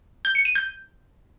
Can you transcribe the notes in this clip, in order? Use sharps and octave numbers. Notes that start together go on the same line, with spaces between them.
G6
C#7
D#7
G6